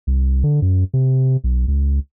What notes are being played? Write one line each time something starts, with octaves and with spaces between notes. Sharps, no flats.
C2
D3
F#2
C3
B1
C#2